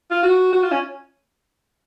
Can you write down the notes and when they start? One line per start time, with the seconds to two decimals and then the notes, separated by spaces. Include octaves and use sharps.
0.11 F4
0.23 F#4
0.53 F#4
0.62 F4
0.72 C#4